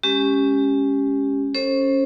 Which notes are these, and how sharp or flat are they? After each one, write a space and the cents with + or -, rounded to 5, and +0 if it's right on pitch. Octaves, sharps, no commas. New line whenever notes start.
G#3 +0 C#4 +0 G4 +0
C#4 +0 A4 +5 C5 +30